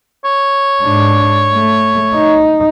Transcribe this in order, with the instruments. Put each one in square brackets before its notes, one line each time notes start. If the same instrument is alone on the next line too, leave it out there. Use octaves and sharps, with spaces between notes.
[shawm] C#5
[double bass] G#2 D4
A3
D#4